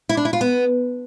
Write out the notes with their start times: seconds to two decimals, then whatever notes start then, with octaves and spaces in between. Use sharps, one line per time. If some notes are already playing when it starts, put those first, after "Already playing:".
0.09 E4
0.17 D4
0.25 E4
0.33 F4
0.41 B3